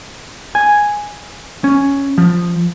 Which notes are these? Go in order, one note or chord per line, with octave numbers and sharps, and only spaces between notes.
G#5
C#4
F3